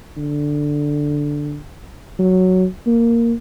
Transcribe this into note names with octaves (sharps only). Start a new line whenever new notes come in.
D3
F#3
A#3